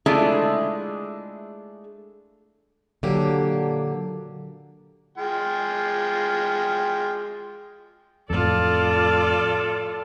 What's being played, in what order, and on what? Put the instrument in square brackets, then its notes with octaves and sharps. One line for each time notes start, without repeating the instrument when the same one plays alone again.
[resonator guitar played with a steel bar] G#3 A3 D4 E4 F4 G#4
[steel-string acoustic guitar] A#2 D3 F#3 A#3 D4 G4
[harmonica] G#3 F4 G5
[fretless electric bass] F2 A2 [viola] F4 D5 [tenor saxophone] A4